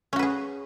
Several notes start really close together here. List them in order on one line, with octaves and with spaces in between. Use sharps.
C#4 F#4 B4 G#4